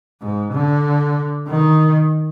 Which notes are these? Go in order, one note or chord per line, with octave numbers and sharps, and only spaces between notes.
G#2
D3
D#3